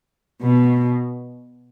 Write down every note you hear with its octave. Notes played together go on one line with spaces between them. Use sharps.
B2